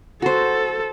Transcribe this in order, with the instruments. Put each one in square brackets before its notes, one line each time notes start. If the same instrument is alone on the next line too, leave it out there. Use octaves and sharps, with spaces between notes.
[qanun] F#4 C5 [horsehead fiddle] A4